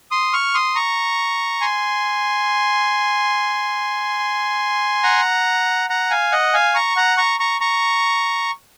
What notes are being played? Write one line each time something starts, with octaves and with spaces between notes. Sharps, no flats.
C6 D#6
C#6 F6
C6 D#6
A#5 C#6
G#5 C6
F#5 A#5
F#5 A#5
F5 G#5
D#5 F#5
F5 G#5
A#5 C#6
F#5 A#5
A#5 C#6
A#5 C#6
A#5 C#6